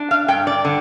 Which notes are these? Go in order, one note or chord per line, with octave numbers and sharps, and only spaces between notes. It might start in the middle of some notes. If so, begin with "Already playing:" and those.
Already playing: D4
F5
G2 G5
D5
D3